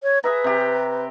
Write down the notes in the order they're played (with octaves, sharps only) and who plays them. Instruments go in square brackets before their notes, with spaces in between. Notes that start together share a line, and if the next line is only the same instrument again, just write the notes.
[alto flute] C#5
[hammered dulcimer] G#4 E5 A#5 [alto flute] B4
[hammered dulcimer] C3 G4